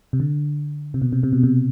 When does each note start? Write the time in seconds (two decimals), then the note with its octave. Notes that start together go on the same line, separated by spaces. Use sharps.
0.13 C3
0.20 D3
0.94 C3
1.02 B2
1.13 C3
1.23 C3
1.33 B2
1.43 C3